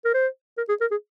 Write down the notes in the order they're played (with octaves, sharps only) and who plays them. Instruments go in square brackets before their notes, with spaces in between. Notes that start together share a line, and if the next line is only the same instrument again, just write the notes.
[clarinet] A#4
C5
A#4
G#4
A#4
G#4